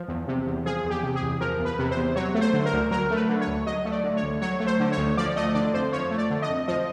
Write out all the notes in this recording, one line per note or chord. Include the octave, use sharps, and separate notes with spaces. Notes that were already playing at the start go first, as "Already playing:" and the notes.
Already playing: F3
E2
C3
E2
F3 G#4
E2
G4
C3
G#4
E2
F3 A#4
E2
B4
C3
C5
E2
F#3 C#5
A3
C5
D3
A#4
D2
F#3 A#4
A3
B4
D3
C#5
D2
F#3 D#5
A3
D5
D3
C#5
D2
F#3 C#5
A3
C5
D3
C#5
D2
F3 D5
A3 D#5
D3 D5
F2 C5
F3 C#5
A3
D5
D3
D#5
F2
F3 D#5